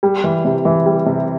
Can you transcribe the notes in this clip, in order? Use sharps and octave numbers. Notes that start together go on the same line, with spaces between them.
G3
E3
C3
E3
G3
C3